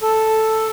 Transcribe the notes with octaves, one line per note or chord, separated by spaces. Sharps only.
A4